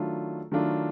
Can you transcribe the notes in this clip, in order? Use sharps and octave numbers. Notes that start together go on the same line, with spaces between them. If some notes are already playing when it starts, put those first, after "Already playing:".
Already playing: D#3 F#3 A3 D4 F4
D#3 F#3 A3 D4 F4